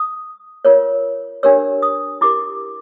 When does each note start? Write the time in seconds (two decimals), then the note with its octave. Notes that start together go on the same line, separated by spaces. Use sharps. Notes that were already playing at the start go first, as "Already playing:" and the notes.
Already playing: D#6
0.65 F4 A#4 C#5
1.43 D4 G4 A#4 C#5 E6
1.82 D#6
2.21 E4 G4 A#4 D6